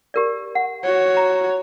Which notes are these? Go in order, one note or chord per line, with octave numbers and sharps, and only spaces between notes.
G4 A#4 D5
F#5
F#4 C#5
A#5